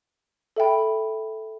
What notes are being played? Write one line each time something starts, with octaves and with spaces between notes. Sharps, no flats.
A4 E5 G5 B5